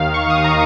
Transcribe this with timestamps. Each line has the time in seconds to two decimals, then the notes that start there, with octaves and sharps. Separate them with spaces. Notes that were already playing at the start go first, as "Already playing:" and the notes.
Already playing: D#2 D#3 F5
0.14 D#2 C#6
0.30 D#6
0.37 D#2
0.44 A#5